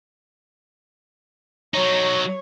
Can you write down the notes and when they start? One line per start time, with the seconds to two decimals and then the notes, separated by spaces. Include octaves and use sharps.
1.74 F#3 D#4 C#5